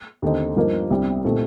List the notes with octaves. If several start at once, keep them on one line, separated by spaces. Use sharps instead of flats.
D#2 D3 A3 C4 D#4
G2 F3 A#3 D#4
C2 C3 G3 D4
A#2 A3 C4 D#4